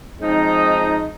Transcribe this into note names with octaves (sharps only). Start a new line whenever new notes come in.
F3 G#3 C4 D#4